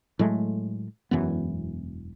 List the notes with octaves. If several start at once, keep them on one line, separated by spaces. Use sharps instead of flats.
A2 F#3 G#3 A3
E1 F#2 E3 B3